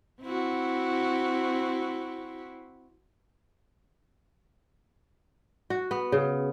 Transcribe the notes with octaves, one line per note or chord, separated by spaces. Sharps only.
C4 E4 F#4
F#4
B3
C#3